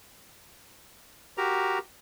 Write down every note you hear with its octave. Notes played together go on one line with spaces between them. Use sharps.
F#4 G4 A#4 A#5